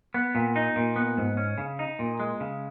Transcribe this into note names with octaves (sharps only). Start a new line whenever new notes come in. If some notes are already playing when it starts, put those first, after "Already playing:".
B3
A#2
D#4
A#2
B3
G#2
C#4
C#3
D#4
A#2
G#3
C#3